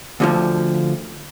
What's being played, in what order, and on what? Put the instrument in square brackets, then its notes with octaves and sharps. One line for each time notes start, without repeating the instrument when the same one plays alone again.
[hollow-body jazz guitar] D2 D3 F3